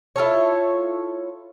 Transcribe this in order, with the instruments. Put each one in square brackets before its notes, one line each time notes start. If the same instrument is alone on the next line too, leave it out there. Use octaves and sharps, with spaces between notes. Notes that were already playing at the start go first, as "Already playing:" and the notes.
[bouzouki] E4 F4 A4 C#5